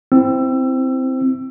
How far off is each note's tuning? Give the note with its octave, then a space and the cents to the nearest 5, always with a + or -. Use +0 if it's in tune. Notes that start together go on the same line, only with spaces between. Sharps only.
C4 -5 E4 +0 E6 +25